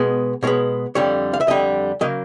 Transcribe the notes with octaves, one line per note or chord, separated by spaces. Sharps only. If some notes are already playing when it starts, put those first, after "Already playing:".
Already playing: B2 G#3 B3
B2 G#3 B3 C#5
F2 D3 G3 C#5
F5
E5
F2 D3 G3 D#5
C#3 F#3 A#3 D#5